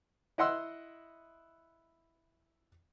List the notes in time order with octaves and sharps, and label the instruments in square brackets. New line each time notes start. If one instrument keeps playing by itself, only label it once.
[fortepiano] E4 D#5 F#5 C6 E6